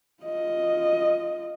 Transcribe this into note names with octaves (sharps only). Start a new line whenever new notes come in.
F4 D#5